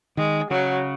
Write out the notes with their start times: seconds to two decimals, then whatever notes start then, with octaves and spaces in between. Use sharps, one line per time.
0.17 D#3 G#3
0.51 C#3 F#3